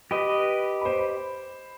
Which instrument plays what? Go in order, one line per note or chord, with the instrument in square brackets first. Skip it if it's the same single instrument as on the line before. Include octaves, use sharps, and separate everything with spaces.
[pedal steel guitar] G4 B4 D#5
[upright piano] C5 B5